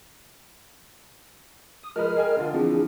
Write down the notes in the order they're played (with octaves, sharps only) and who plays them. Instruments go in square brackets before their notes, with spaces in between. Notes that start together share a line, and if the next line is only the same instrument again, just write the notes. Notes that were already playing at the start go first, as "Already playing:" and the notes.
[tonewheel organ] D#6
[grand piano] F3 G#3 B4 [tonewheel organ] A#4 D#5 F6
[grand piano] G#4 G5 G#5
D3 F4
[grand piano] E3 F3 [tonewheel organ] C4 D4 G#4